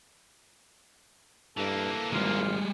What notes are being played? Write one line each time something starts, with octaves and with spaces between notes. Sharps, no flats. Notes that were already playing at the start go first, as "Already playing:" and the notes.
G2 E3 A#3 A4
G#1 G3 G#3 F4